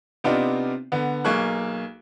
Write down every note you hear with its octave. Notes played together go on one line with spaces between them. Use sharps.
C3 B3 C4 D4 D#4 F4
D3 B3
B1 A#3 G#4 C#6 F#6